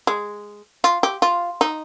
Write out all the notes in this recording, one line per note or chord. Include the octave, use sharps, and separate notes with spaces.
G#3
F4
G4
F4
D#4